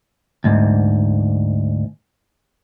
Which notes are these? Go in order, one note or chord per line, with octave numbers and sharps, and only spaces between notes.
D2 G#2